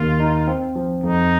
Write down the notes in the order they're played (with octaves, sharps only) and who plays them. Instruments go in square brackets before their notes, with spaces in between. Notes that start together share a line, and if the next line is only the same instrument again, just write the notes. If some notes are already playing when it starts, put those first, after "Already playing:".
Already playing: [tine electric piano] D#2 D#3 A#3 [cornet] F4
[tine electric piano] D#4
C4
F3
[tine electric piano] F2 [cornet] D#4